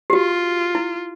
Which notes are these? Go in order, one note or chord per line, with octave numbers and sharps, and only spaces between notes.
G4
F4 F#4
E4